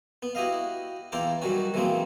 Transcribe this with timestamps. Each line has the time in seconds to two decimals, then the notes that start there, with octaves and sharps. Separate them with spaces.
0.23 B3
0.35 E4 F#4 G4 D#5 F5
1.12 E2 E4 F4 G5 A#5 D6
1.42 D#3 F#3 G3 C#4 F#4
1.74 D#3 E3 F#3 G#3 A#3 C4